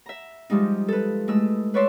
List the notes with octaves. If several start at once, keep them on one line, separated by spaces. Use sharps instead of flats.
E5 A#5
F3 G3 G#3 D#4
A4 B4
G#3 A3 E4 E6
B4 C#5 D5 E5 C6